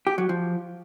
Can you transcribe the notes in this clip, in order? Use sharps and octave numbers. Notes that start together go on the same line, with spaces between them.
G4
F#3
F3